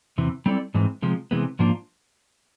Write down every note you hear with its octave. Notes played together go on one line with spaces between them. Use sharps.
E2 C3 E3
G3 C4 E4 A4 D5
G#2 E3 G#3 C4
C3 F3 G#3
C3 E3 G#3 B3
G#2 F3 A#3 D4 F4